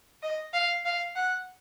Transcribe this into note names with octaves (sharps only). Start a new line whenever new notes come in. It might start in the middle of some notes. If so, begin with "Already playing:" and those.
D#5
F5
F5
F#5